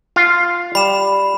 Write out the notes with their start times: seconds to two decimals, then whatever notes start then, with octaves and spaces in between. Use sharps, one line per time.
0.16 F4 F5
0.75 G3 B5 E7